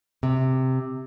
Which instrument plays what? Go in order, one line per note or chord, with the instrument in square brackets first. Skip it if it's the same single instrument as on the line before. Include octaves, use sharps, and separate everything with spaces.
[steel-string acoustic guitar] C3